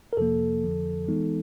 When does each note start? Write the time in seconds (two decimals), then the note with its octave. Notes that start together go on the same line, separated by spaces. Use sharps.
0.13 A#4
0.17 F2 C3 F3 A#3 A4
0.63 F2 D3 F3
1.08 E3 G#3 B3 D#4